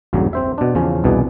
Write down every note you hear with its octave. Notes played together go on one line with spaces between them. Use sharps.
A#1 E2 G2 C#3 F#3
C4 C5 E5
B2 D4
E2 C#3 F3 C#4
C2 B2 E3 D4 G#4